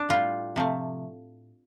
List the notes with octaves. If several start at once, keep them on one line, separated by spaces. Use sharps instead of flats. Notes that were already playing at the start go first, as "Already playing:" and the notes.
Already playing: D4
A2 G3 F4
C3 F3 A3